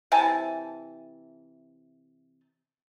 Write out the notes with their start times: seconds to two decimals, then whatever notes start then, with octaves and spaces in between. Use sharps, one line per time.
0.12 C3 E3 G#5 A5